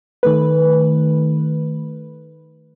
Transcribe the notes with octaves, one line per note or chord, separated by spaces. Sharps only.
D#3 A3 B4